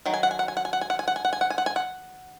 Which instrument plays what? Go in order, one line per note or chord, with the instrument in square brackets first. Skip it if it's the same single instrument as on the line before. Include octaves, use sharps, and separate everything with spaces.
[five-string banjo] D#3 F#3
G#5
F#5
G#5
F#5
G#5
F#5
G#5
F#5
G#5
F#5
G#5
F#5
G#5
F#5
G#5
F#5
G#5
F#5
G#5
F#5